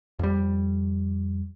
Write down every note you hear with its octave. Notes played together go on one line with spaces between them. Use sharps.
F2 G3